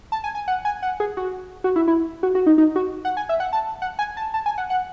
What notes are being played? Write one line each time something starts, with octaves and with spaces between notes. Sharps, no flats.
A5
G#5
G#5
F#5
G#5
F#5
G#4
F#4
F#4
E4
E4
F#4
F#4
D#4
D#4
F#4
F#5
G#5
E5
F#5
A5
F#5
G#5
A5
A5
G#5
F#5
F#5